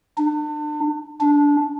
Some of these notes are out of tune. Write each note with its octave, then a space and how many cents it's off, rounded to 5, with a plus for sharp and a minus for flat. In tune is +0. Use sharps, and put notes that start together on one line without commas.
D4 +35
D4 -15